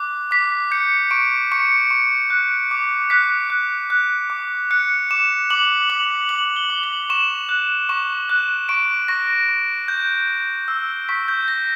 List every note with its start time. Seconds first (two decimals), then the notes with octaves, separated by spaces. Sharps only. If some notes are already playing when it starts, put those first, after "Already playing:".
Already playing: D6 F#6
0.31 D6 B6
0.71 G6 C#7
1.11 C#6 D7
1.52 C#6 C#7
1.91 C#6
2.30 F#6
2.71 D6
3.10 F#6 B6
3.50 F#6
3.90 F#6
4.30 D6
4.71 F#6 C#7
5.11 D6 E7
5.50 D6 F#7
5.90 D6 F#7
6.29 D6 F#7
6.56 G7
6.70 D6
6.84 F#7
7.10 C#6 E7
7.49 F#6
7.89 C#6
8.29 F#6
8.69 C#6 D7
9.08 C#6 A#6
9.49 C#6
9.88 G6
10.28 G6
10.68 E6
11.09 C#6 B6
11.28 G6
11.48 G6 A#6